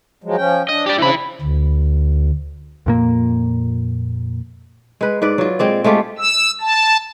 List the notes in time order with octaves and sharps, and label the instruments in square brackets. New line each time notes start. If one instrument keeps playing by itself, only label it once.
[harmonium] F3 F#3 G#3
F3 C#4 G5
[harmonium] D4 [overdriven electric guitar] D#5
[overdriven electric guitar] G4 D5
[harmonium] C#3 C4 D4 [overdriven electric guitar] E3 B5
[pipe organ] D2
[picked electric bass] F2 A#2 A#3
[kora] G#3 B4
G#2 B4 D5
F#3 F4
A#2 G#3 C4 D5
G#3 A3 F4 G4
[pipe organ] E6
A5